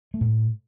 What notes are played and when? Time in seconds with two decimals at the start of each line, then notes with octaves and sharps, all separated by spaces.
0.14 A3
0.21 A2